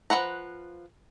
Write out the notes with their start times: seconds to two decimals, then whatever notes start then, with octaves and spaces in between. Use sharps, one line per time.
0.10 F3 F4 B4 F#5 A#5